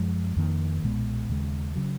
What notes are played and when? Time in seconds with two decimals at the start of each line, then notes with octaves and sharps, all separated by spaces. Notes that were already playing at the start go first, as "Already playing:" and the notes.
Already playing: F#2 F3 G#3
0.37 F2 D#3 A#3
0.83 B1 A#2 G#3 B3
1.29 D#2 C#3 G#3
1.75 C#3 F#3